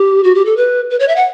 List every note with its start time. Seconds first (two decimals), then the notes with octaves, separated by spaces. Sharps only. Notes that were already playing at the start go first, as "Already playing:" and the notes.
Already playing: G4
0.24 F#4
0.35 G4
0.45 A4
0.57 B4
0.90 B4
1.00 C#5
1.08 E5
1.16 F#5